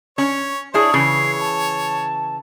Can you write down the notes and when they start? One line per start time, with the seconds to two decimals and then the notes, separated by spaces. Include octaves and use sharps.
0.18 C#4 C#5
0.74 D4 E4 G#4 C#5
0.94 C#3 E3 C7
1.40 A5